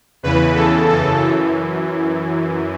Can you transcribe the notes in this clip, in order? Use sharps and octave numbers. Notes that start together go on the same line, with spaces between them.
E2 C#3 E3 B4
E2 C#3 E3 A4
F#2 C#3 E3 A4
F#2 E3